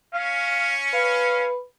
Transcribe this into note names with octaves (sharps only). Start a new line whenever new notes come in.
C#4 F5
B4 F5